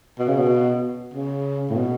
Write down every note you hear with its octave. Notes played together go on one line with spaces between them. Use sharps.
B2
C#3
B2
C#3
A2
B2